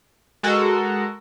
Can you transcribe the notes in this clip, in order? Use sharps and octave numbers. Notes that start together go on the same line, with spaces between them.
G#3 F#4 A4 A#4